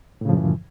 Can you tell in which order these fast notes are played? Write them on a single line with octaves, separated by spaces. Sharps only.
A2 C#3 F3 F#2 E3